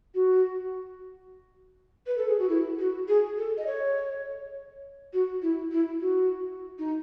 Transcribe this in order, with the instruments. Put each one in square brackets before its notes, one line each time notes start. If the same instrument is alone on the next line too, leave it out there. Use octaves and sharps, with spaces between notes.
[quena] F#4
B4
A4
G#4
F#4
E4
F#4
G#4
A4
D#5
C#5
F#4
E4
E4
F#4
D#4